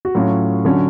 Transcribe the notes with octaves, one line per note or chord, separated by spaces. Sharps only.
F#4
A2 F#3 C#4 F4
D3 F#3 C#4